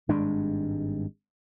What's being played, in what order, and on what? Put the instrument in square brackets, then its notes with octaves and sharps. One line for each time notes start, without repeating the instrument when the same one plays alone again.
[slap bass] G#1 G2 G#3 D4